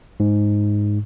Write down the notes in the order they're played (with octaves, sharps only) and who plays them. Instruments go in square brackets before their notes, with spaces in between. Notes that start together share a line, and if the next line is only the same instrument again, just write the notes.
[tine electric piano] G#2